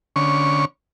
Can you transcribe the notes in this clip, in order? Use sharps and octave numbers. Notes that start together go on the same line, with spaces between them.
D3 C#4 C#6